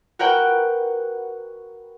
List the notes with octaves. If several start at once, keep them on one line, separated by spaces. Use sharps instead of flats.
F#4 A#4 B4 C#5 F#5 G5